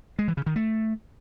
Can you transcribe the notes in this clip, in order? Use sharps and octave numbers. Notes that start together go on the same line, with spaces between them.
G#3
E3
C#3
D#3
A3